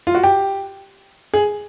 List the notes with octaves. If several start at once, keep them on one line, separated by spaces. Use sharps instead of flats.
F4
F#4
G4
G#4